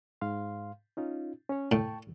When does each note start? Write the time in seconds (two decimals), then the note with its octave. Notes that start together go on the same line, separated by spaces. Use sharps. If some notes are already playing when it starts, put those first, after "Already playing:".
0.21 G#2 F5 C6
0.97 C#4 D#4 F4
1.49 C#4 C#5
1.72 A2 G5 A5 C#6